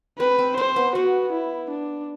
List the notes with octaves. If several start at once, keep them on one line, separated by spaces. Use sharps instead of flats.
C4 B4
C4
C4 C5
B3
B3 F#4
E4
D4